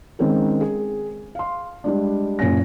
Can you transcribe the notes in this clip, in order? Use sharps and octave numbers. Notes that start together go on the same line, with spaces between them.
D#3 G#3 C4 C#4 G#4 A#4
G#4
F5 C6
G3 G#3 D4
F#1 A#2 C#4 G#5 A#6